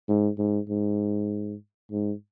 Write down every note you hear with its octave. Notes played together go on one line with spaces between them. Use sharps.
G#2
G#2
G#2
G#2